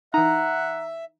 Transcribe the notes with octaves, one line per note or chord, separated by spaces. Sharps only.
E3 D#4 E5 F#5 A#5